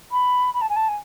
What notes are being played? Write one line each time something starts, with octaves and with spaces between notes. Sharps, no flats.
B5
B5
A5
G#5
A5
G#5